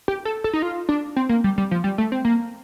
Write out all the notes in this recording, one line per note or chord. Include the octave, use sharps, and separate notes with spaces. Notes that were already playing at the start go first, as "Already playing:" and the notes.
G4
A4
A4
D#4
F4
D4
C4
A#3
G3
G3
F3
G3
A3
C4
A#3